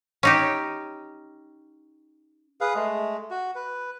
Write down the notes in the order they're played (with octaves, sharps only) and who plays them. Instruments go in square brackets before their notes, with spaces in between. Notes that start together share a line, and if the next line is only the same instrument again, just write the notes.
[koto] C#4 D#4 G4
[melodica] G#4 B4 F5
G#3 A3
F#4
B4